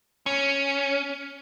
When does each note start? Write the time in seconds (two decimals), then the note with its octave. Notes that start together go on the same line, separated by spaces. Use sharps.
0.26 C#4